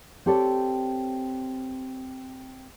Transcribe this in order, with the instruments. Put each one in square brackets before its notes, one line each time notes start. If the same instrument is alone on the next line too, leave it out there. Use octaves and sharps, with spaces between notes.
[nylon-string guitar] C4 G4 A4 C#5 D5